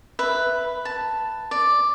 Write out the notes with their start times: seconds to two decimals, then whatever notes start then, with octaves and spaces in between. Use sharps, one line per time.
0.19 B4 E5
0.85 A5
1.51 D5